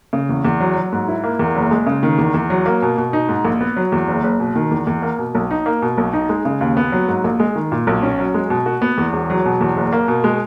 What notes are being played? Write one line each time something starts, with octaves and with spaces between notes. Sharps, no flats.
C#3
E2
E2
F#3
F#3
G#2
E4
A#3
E2
F#1
G#3
C#3
D#3
E2
E2
F#3
A#3
B2
B2
D#4
G#2
A#1
B3
F#3
E2
F#1
F#1
B2
D#3
E2
E2
A#3
B2
B1
D#4
A#3
B2
B1
D#4
G#3
C#3
D#2
B3
F#3
G#2
A#1
G#3
D#3
A#2
B1
C#4
F#3
G#3
B2
F#4
B3
E2
E1
F#3
B2
E2
F#1
A#3
B2
G#3